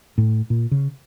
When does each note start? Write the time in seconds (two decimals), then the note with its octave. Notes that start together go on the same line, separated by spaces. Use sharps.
0.18 A2
0.50 A#2
0.71 C#3